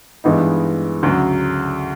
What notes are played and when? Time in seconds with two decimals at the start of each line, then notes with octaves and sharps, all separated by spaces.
0.24 G2 E3 G#3 B3 D#4
1.03 D2 C#3 F#3